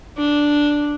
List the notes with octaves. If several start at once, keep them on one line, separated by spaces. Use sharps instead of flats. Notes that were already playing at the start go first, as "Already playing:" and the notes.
D4